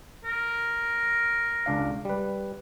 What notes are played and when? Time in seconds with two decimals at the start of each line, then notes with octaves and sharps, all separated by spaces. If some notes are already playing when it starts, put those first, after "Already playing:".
0.25 A#4
1.66 C#2 D4 F5
2.05 G3 B4